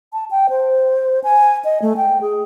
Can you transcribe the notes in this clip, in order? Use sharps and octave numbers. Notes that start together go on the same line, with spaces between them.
A5
G5
C5
G#5
D#5
A3
G5
G#4